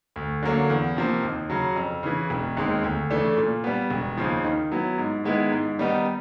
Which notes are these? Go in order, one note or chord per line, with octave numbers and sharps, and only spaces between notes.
D2
D3 F#3 A#3 C#4
E2
C3 F3 A#3
D#2
C#3 F#3
F2
C#3 E3
E1
D#2 D#3 G#3 C4
D2
C#3 E3 A3 D4
A#2
G3 B3
E1
D#2 C#3 F3
D#3
F#3 B3 E4
G#2
D#3 G#3 B3 E4
G#2
D#3 G3 B3 D#4